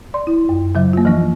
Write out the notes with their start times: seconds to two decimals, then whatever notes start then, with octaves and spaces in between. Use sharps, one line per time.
0.14 D5 C6
0.27 E4
0.49 F#2
0.75 C#3 F#3 E5
0.93 A#3 F4
1.05 E3 F3 A#3 D4